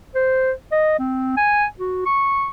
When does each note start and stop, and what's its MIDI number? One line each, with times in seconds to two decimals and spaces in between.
0.15 0.52 72
0.72 0.95 75
0.99 1.34 60
1.37 1.66 80
1.80 2.02 66
2.06 2.51 85